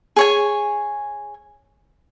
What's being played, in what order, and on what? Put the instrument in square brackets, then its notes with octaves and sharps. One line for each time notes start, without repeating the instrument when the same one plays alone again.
[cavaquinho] G#4 C#5 G#5